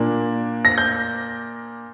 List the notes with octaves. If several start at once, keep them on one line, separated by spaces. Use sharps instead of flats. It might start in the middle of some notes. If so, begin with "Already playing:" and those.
Already playing: A#2 A#3 D4
A#6
G6